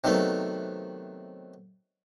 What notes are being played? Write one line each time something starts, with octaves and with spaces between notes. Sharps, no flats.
C3 D#3 F#3 A3 B3